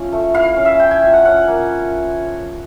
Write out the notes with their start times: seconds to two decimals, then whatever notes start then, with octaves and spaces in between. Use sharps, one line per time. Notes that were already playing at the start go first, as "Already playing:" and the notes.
Already playing: F3 C#4 E4
0.13 A3
0.34 E4 F5
0.57 C#4
0.65 E5
0.80 E4 G5
0.91 G#5
1.02 F3
1.13 F#5
1.25 C#4 F#5
1.48 A#3